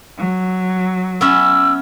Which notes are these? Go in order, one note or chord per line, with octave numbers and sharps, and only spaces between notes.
F#3
B3 C#4 E5 E6